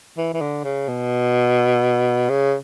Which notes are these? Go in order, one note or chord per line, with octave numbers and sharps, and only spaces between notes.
E3
E3
D3
C#3
B2
C#3